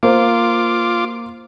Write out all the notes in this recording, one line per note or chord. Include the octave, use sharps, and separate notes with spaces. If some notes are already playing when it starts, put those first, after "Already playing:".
A#3 F4 C5 D6